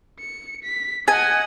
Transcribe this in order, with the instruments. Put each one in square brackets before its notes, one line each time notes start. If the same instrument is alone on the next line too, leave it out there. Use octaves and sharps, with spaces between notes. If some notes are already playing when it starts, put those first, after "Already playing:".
[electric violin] C#7
B6
[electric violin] D#5 F#5 [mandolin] G#5